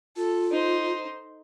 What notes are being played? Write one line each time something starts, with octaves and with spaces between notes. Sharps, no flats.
F4 A4
D#4 C5